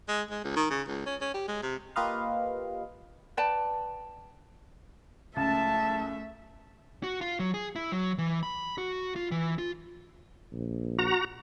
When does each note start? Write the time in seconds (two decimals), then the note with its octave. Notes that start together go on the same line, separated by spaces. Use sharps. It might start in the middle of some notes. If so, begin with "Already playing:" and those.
0.08 G#3
0.30 G#3
0.44 C#2
0.56 D#3
0.70 C#3
0.88 C#2
1.06 C#4
1.21 C#4
1.34 G4
1.48 G#3
1.62 C3
1.96 A#3 F4 G4 B4 D#5 F5
3.37 B4 D5 G5 A5
5.36 C#2 A3 E5 A5
7.03 F#4
7.21 F4
7.39 F#3
7.54 G#4
7.76 E4
7.92 F#3
8.18 E3
8.43 B5
8.78 F#4
9.16 F4
9.31 E3
9.58 F4
10.53 A#1
10.99 F#4 A#5